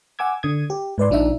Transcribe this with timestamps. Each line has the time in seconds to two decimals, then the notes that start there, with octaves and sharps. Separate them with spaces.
0.19 F#5 G#5 D6 E6 G#6
0.43 D3 D#6 G#6
0.70 G4
0.98 G#2 B4 D5 C6
1.10 A#1 F3 D4 D#4 E5